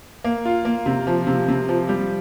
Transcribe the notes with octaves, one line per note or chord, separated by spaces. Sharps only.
A#3
F4
A#3
C3
F3
C3
C3
F3
G3